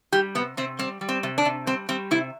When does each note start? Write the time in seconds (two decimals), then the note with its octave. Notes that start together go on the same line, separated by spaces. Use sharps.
0.12 G3 G4
0.35 C3 B3
0.57 C3 C4
0.79 G3 C4
1.01 G3
1.09 C4
1.23 C3
1.38 D4
1.45 C3
1.67 G3 C4
1.89 G3 C4
2.11 C3 E4